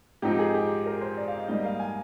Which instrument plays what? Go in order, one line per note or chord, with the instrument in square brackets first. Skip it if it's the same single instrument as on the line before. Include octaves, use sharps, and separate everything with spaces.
[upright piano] G#2 F3 C4 D#4 G4
G#4
G4
A#4
C5
D5
F5
D#5
G#2 G3 A#3 D#5
F5
G#5